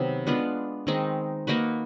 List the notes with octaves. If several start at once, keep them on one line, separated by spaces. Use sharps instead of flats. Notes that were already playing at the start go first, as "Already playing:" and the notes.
Already playing: C3 D#3 F#3 B3
G#3 B3 D4 F4
D#3 G#3 C4 D#4
A#3 D#4 F#4 B4